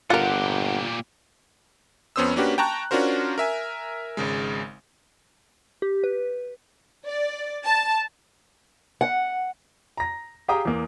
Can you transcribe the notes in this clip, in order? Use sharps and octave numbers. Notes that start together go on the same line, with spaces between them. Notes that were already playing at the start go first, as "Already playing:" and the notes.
G1 A#2 F4 G4 A#4 F#5
F2 B3 C#4 C5 D#6 E6
A#3 C#4 D4 F#4 G4 B4
G5 A5 A#5 C#6 F#6
C#4 D4 F4 F#4 A#4 C5
A#4 E5 G#5
G#1 C#3 G#3
G4
B4
D5
A5
F#5
A#5 A#6
G4 G#4 F5 G5 A#5 D#6
E2 A#3